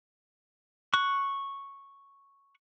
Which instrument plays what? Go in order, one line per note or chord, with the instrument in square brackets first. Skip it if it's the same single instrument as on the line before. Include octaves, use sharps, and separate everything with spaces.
[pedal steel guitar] C#6 F#6